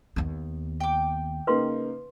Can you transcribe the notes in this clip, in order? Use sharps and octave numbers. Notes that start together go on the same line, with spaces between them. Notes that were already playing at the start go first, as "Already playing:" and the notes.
D#2 B3
G5 D6
C#3 A#3 D#4 B4 F5 C6